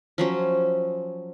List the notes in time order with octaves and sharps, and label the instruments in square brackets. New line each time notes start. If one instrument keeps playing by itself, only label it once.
[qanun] F3 F#3 C#4